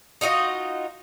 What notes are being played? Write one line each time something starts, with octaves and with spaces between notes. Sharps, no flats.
D#4 F4 F#4 D#5